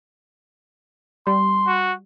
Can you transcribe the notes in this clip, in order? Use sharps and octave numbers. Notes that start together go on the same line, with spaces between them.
G3 C6
F#4